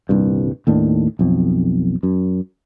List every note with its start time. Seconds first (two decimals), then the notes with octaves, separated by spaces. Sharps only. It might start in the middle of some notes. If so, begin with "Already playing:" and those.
0.09 D#1 C2 G2
0.67 D#2 A2 D#3 D4
1.19 B1 F2
2.03 F#2